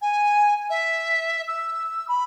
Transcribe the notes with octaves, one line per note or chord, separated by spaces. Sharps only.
G#5
E5
E6
B5